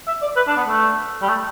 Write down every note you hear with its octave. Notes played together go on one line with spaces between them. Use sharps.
E5
D5
B4
D4
B3
A3
G3
A3